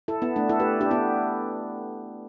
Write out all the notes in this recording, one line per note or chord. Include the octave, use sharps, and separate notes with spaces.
E4 A4
B3 E4
A3 D4
E4 A4
G4 B4
D4 G4
B3 E4